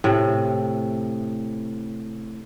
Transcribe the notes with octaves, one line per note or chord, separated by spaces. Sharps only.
A2 C3